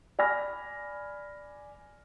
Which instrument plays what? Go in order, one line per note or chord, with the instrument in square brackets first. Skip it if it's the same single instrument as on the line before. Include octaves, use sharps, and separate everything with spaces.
[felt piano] D5 G#5 B5 F6 A#6